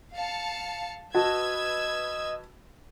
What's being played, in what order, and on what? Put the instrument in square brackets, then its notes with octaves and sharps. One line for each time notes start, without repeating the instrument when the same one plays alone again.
[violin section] F5 A5 C#7
[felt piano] F#4 A5 [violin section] B4 E6 G#6 [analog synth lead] D#5